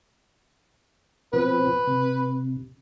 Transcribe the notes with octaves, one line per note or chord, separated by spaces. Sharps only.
B2 F3 C4 B4
C3